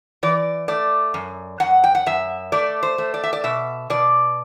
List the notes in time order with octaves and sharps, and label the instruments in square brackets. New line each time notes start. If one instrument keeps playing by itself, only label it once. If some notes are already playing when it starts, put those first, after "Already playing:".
[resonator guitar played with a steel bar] E3 D5
A3 D5
F#2
F#2 F#5
G5
F#5
F#2 E5
A3 D5
C5
A3
D5
E5
D5
B2 E5
B2 D5